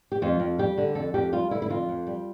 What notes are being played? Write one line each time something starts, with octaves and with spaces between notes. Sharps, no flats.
G4
F2 F4
F2
G3 G4
D3
F2 A4
F2 G4
G3 F4
D3 E4
E4
F2 F4
F2
G3